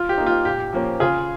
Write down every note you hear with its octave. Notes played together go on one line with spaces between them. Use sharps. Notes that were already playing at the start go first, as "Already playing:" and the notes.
Already playing: F4
G4
A#3 D#4
F4
A#2 G4
F3 A#3 C#4
C#3 F4 G#4